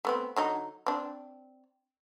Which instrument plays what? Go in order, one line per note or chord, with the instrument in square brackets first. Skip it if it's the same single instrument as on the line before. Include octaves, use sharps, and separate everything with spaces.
[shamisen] A3 B3 C4
D3 F#3 D#4
C4 D4